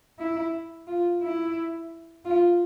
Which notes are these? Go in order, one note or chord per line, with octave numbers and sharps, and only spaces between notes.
E4
F4
E4
F4